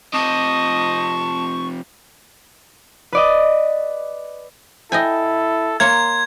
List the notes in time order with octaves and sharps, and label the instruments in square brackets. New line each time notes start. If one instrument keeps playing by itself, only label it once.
[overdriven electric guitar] C3 F3 [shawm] D#5 [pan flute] A5 [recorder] C#6
[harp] B4 D5 D#5
[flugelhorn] E4 [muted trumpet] A4 [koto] D#5 G5 G#5
[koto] A#3 C#5 [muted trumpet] C6 [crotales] G#6